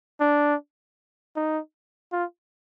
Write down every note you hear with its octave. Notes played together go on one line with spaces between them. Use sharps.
D4
D#4
F4